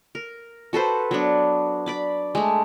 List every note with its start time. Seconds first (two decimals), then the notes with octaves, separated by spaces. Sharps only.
0.15 A#4
0.73 F#4 A4 B4 C5
1.11 F#3 B3 D4
1.86 D5 B5 D6
2.35 G#3 A3